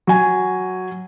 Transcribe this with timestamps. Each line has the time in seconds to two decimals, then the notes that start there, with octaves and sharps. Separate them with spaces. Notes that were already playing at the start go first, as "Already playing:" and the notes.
0.07 F#3 G#5